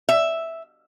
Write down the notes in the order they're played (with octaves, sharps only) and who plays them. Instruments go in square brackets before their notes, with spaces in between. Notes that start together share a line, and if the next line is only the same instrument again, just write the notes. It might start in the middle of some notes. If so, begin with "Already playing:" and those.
[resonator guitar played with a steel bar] E5